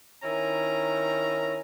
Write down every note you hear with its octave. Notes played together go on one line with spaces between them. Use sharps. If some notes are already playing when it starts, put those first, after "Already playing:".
D#3 C#4 E4 A#5